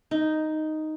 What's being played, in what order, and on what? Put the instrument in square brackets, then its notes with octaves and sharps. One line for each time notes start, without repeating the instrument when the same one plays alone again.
[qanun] D#4